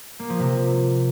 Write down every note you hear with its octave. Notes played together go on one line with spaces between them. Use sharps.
A#3
F3
C3